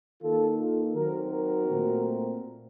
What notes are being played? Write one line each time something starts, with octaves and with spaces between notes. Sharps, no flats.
D#3 A#3 F4 A4
F4 A4
D#3 F#3 C4 F#4 A#4
F#4 A#4
A#2 A3 C4